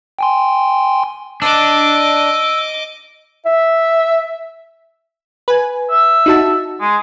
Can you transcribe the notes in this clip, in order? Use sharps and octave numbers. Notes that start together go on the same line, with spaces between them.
G5 G#5 C6
D4 D#5 D6 E6
E5
B4 G#5
E5
D#4 F#4 A5
G#3